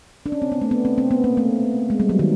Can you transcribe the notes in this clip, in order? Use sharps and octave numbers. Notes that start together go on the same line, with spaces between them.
D4
C#4
C4
B3
A3
B3
C4
C4
B3
A#3
A3
G#3
G3
F#3
D#3